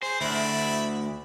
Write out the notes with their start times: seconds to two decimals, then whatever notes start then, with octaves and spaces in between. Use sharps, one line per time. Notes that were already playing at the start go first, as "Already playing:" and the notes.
0.02 G#4 C5
0.21 D2 E4 D5 B5